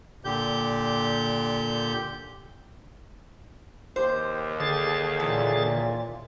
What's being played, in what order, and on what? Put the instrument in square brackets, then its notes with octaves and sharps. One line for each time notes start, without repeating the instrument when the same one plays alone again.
[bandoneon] A#2 D3 G4 G6
[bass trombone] D#2 [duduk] G4 [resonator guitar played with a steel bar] C5
[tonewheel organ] D3 G#4 A6
[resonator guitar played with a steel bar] E2 [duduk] A#2